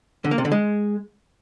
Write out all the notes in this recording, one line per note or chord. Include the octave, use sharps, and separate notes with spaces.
D3
A#3
C3
D3
G#3